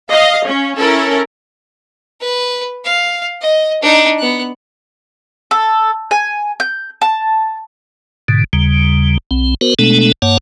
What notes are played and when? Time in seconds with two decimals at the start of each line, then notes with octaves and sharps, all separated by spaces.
0.11 D#5 F5
0.47 C#4
0.79 C#4 E4 A4 A#4
2.20 B4
2.84 F5
3.41 D#5
3.82 D4 D#4
4.19 B3 F#6
5.51 A4
6.11 G#5
6.60 G6
7.02 A5
8.28 G#2 B2 D3
8.53 D#2 C#3 G3
9.31 B1 C4
9.61 B3 F#4 A#4 C5
9.79 B2 G#3 A3 B3 D4 A4
10.22 G2 A#3 C#5 F#5 A5